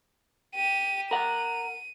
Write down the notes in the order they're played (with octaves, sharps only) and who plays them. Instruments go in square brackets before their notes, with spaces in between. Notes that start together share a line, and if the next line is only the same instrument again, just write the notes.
[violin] G4 D#7
[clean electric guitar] A#4 F#5 [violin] D#7